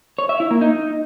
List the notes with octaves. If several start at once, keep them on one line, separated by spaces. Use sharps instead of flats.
C#5
E5
E4
A#3
D#4